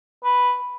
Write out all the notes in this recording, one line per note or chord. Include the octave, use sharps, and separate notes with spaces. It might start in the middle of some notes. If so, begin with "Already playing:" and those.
B4